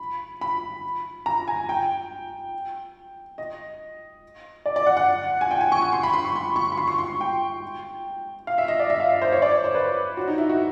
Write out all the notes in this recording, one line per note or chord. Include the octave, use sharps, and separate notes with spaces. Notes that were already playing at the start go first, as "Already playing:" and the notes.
Already playing: B5
B5
A#5
G#5
G5
D#5
D5
D5
F#5
F#5
G#5
G5
G#5
C#6
C#6
C6
B5
C6
C#6
C6
C#6
B5
C6
C#6
C6
G5
F5
E5
D#5
D5
E5
F5
E5
C5
C#5
D5
C5
C5
B4
F#4
D#4
E4
F#4